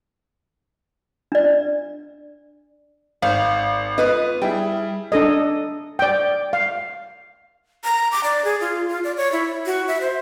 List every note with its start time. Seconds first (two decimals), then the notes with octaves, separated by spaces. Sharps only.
1.32 D4 D5
3.22 G#1 C5 F5
3.98 B3 F4 B4 D#5
4.42 G3 E4 G#4 G5
5.12 D4 A4 D#5
5.99 D5 G5
6.53 F5
7.84 A#5
8.12 D6
8.23 D5
8.44 G#4
8.60 F4
8.88 F4
9.04 D5
9.17 C#5
9.32 E4
9.66 F#4
9.88 E5
10.01 C5